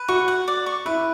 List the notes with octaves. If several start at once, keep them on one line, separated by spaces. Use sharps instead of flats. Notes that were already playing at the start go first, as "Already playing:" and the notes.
Already playing: B4
F#4 C#6
F#5
D5
C#6
E4 B4